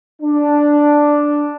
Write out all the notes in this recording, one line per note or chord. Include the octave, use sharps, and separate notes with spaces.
D4